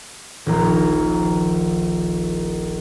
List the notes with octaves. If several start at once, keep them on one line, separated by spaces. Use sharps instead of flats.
D#1 A#1 A#5